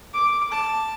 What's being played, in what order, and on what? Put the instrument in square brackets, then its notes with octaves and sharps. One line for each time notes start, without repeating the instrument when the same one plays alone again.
[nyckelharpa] D6
A5